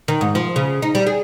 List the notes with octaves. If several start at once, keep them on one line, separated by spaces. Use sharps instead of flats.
D#3
G#2
F3
C#3
D#4
G3
G#4